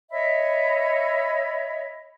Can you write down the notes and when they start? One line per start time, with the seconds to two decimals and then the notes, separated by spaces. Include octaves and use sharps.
0.11 C#5 D#5 E5 B5